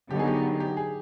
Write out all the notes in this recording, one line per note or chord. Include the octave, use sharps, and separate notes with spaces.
D3 F#3 B3 D#4 G4
G#4
G4
G4
G4
G#4